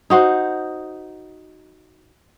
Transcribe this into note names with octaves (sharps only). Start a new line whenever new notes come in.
D#4 F#4 C5